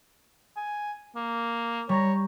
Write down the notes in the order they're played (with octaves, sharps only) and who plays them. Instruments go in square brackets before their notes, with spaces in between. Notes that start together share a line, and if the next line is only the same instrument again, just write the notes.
[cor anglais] G#5
A#3
[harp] G3 A#5 A#6 [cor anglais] C#5